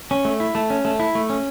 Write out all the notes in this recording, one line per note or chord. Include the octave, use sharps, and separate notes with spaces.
C#4
A3
E4
A3
C#4
A3
E4
A3
C#4